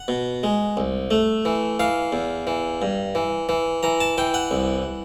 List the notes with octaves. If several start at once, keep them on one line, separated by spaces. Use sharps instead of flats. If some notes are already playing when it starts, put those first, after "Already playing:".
Already playing: F#5
B2
G#3
C2
A3
E3
E3 F5
E2
E3
G2
E3
E3
E3 A#5
A5
E3 G5
F#5
C2